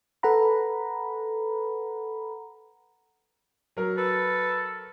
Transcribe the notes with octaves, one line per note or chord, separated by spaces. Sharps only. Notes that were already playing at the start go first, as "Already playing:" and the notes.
A4 B4 F#5 A#5 B5
F#3 A#4
A4 B4